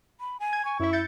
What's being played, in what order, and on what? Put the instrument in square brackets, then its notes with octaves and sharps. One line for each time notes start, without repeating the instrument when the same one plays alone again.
[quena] B5
G#5
[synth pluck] G#6
[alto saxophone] G#5 [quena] C#6
[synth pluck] F#2 E5 [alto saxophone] E4
[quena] E5 [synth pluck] G6 A6 C#7